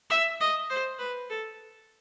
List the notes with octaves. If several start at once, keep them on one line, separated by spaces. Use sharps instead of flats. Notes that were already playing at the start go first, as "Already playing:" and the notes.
E5
D#5
C5
B4
A4